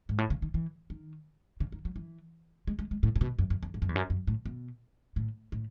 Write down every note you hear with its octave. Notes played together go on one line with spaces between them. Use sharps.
G#2
A2
C#3
D#3
E3
D#3
C#3
D#3
F#3
E3
G#3
G#3
G#3
A2
A2
B2
F#2
F#2
E2
G#2
F#2
E2
F#2
F#2
A2
B2
A2
A2